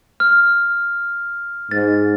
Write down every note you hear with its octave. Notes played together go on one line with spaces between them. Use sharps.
F6
G#2 A6